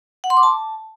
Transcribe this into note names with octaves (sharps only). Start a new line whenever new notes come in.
F#5
C6
D6
A5